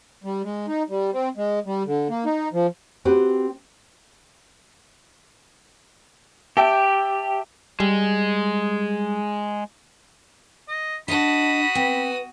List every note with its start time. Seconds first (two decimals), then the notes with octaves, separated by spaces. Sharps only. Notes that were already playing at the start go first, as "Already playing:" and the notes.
0.24 G3
0.43 G#3
0.68 D#4
0.89 G3
1.12 C4
1.37 G#3
1.66 G3
1.86 D3
2.09 A#3
2.25 D#4
2.53 F3
3.05 C4 F#4 G4 B4
6.57 G4 E5 G5 A5
7.80 G3 G#3
10.68 D#5
11.08 D4 F#4 D#5 A5 B5 D#6
11.75 C4 B4